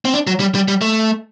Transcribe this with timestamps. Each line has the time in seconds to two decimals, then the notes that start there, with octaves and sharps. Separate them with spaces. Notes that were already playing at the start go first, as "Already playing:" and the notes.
0.05 C4
0.13 D4
0.27 F#3
0.40 G3
0.55 G3
0.68 G3
0.81 A3